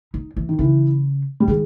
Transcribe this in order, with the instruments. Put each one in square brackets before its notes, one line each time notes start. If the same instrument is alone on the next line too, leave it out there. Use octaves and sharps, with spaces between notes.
[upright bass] D#4
E3
[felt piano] D#3
[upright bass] C#3 [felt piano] E3
[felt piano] G3
[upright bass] D#3 [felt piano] G#3